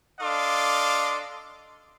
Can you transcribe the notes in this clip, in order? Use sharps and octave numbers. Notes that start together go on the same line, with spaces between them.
D4 A4 D#5 F5 C6 D6